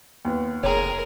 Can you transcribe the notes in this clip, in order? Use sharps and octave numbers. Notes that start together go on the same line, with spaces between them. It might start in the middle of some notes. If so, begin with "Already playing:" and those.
D#2 B3
F1 G#4 A#4 C#5 A#5